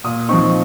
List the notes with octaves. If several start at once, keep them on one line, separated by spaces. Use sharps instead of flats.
A#2 D#6
F3 C4 D#4 C#6